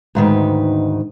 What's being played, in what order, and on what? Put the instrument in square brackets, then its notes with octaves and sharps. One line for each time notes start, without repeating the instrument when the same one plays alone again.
[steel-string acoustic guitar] D2 G#2 D#3 B4